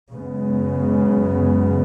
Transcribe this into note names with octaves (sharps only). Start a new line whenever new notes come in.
F#2 C#3 G#3 B3